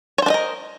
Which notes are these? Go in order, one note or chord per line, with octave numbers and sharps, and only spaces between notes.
D4 A#4 C5 C#5 D#5